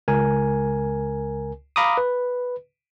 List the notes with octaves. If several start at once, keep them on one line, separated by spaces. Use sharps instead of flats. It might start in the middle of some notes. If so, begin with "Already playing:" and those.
C#2 A#4 G#5
F5 A#5 B5 D6 D#6
B4